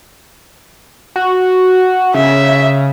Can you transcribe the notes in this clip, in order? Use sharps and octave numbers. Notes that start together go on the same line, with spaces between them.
F#4
C#3 E5